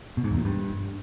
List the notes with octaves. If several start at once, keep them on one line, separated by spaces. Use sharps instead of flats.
B2
G#2
E2
A#2
G2